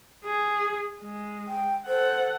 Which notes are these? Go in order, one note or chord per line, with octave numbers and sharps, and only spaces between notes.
G#4
G#3
G5
A4 C5 F#5